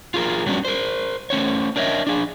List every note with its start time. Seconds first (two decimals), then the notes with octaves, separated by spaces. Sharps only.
0.14 F4 G#4 A#4
0.46 F#3 G3 B3 C#4 D4 F#4
0.65 A#4 C5
1.30 A3 C#4 C5 C#5
1.76 D4 A#4 C#5 D#5 E5
2.07 D4 G#4